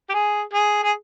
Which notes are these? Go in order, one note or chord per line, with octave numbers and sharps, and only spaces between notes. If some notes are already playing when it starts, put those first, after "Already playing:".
G4
G#4
G#4
G#4